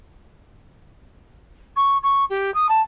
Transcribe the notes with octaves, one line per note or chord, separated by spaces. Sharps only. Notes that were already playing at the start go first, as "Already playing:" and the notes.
C#6
C#6
G4
D#6
A5